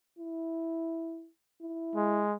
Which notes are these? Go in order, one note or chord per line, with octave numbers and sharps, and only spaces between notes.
E4
E4
G#3